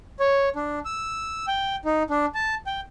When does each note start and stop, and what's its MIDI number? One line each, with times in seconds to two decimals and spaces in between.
0.20 0.49 73
0.56 0.79 62
0.85 1.46 88
1.48 1.76 79
1.85 2.03 63
2.10 2.26 62
2.35 2.55 81
2.67 2.81 79